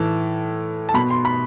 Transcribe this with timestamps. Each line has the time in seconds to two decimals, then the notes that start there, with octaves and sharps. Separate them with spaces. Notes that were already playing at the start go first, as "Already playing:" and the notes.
Already playing: A2 E3 A5
0.89 A5
0.94 B2 B5
1.10 C6
1.25 B5